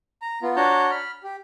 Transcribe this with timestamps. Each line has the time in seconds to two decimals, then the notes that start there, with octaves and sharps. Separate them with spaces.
0.22 A#5
0.42 B3 F4
0.56 D4 F#4 C#5 A5 A#5 G6
0.91 B5 F6
1.23 G4